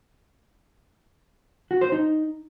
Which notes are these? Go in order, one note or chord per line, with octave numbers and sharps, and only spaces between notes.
F#4
C5
D#4